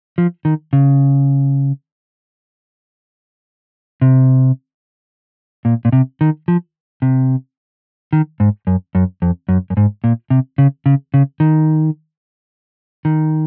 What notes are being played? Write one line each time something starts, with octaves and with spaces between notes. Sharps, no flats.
F3
D#3
C#3
C3
A#2
A#2
C3
D#3
F3
C3
D#3
G#2
F#2
F#2
F2
F#2
F#2
G#2
A#2
C3
C#3
C#3
C#3
D#3
D#3